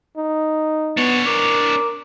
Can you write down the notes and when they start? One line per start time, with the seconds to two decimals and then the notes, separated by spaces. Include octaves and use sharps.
0.17 D#4
0.97 B3 D4 C#5
1.26 A#4 D6